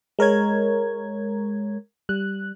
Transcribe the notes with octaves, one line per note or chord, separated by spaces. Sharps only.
G#3 A#4 C#5 G#6
G3 F#6